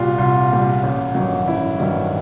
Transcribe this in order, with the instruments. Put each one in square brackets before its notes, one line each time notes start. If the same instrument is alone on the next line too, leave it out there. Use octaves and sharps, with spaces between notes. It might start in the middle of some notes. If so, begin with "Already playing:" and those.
Already playing: [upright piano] C2 A#2 G3 F4 F#4
C2 F4
A#2 G3
A1
G2 D#3 F#3
A1 E4
G2 D#3 F#3